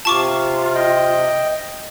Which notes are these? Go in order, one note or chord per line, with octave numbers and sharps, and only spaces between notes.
C3 F4 A5 C#6 D6
D#5 G5